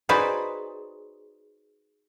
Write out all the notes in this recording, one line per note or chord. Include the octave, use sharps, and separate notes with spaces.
D#4 F#4 G#4 B4 C5 D5